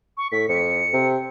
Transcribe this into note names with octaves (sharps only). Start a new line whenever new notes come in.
C#6
A2 B6
F2 C#7
C3